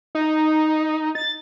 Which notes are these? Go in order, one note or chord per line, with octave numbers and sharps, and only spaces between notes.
D#4
A6